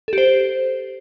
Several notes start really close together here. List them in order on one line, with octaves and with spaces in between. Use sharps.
A4 G4 C5